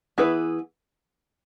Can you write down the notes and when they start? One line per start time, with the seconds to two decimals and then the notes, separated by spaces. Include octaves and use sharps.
0.18 E3 B3 E4 G#4 B4